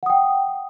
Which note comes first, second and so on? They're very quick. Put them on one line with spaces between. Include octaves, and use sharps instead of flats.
F#5 D#6 G5